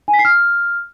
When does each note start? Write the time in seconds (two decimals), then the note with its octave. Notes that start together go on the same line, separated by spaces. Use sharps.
0.08 G#5
0.14 B6
0.19 C7
0.25 F6